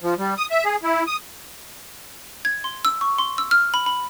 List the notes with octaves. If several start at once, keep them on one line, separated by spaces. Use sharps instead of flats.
F3
G3
D#6
E5
G#4
E4
D#6
G#6
C6
E6
C#6
C6
E6
F6
B5
B5